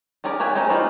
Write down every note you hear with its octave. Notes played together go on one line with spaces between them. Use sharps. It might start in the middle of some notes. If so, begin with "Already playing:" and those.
G3 C#4 G#4 A#4 D5
F#4 C#5 E5 G5 G#5
A3 C4 C#4 G#4 A#5
E3 G3 C4 D#4 F4